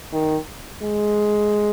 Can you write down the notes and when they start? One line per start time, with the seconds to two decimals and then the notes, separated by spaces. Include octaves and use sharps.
0.12 D#3
0.83 G#3